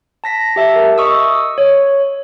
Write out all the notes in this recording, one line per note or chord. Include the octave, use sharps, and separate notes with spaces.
A5 A#6 B6
G4 E5 A5
A#4
D#5 C#6 D#6 E6
C#5